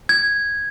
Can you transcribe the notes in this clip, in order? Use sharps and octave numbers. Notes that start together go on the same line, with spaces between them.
G#6